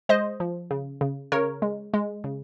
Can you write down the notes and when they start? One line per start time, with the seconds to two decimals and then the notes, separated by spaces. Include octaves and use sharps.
0.09 G#3 C5 D#5
0.40 F3
0.71 C#3
1.01 C#3
1.32 C#3 A#4 C#5
1.62 G#3
1.94 G#3
2.24 C#3